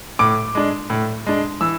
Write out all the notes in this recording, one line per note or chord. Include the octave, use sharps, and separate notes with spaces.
A2 D6
G#3 D4
A2
G#3 D4
E3 E6